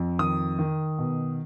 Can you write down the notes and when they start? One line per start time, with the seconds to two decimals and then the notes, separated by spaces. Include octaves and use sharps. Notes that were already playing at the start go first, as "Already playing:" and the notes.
Already playing: F2
0.19 D#3 D#6
0.59 D#3
0.98 B2